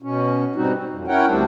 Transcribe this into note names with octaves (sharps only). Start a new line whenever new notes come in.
B2 C#4
G#2 B2 G3 C4 D#4 F#4
C4
F2
C#4 E4 A#4 C#5 F#5 G5
D2 G3 C4 D4